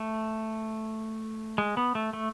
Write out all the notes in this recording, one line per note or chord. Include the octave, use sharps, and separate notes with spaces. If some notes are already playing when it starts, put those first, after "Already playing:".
Already playing: A3
G#3
B3
A3
A3